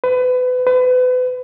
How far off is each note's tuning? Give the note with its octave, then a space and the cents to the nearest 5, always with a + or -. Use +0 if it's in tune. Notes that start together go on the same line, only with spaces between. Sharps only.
B4 +30
B4 +35